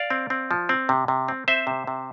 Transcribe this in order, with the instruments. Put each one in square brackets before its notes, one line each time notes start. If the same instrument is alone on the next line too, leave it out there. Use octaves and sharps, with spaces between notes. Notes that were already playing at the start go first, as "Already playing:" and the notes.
Already playing: [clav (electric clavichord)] D5 F5
C4
C4
F3
C4
C3
C3
C4
C4 C5 E5
C3
C3